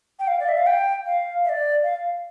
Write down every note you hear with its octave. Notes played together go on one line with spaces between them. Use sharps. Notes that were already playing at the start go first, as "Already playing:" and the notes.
G5
F5
D5
E5
F5
G5
F5
E5
D5
F5